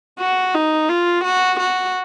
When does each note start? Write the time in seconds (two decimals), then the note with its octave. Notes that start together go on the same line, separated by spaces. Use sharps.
0.20 F#4
0.54 D#4
0.89 F4
1.24 F#4
1.60 F#4